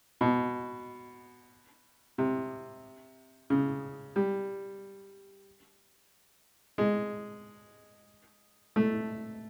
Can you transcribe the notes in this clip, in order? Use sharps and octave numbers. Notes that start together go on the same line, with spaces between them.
B2
C3
C#3
G3
G#3
A3